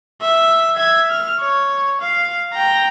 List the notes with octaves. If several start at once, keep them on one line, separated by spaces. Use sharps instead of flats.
E5
E5 G#6
F6
C#5
F5
G5 A#5